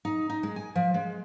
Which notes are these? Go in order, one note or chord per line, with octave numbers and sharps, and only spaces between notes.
D#4
D#4
G#3
G#5
F3
G#3